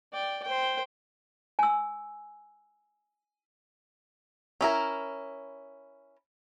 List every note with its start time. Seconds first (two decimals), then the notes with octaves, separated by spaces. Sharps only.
0.13 D5 G5
0.44 C5 G5
1.59 G#5 E6
4.61 C#4 E4 A#4